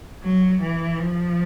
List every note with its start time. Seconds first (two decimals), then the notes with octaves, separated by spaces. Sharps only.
0.23 F#3
0.61 E3
0.99 F3